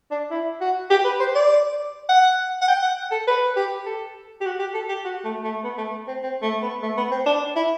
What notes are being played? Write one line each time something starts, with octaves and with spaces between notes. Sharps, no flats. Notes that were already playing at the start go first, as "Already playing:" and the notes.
D4
E4
F#4
G4
B4
C5
D5
F#5
F#5
G5
F#5
A4
B4
G4
A4
G4
F#4
G4
A4
G4
F#4
A3
A3
B3
A3
C4
C4
A3
B3
A3
B3
C4
D4
E4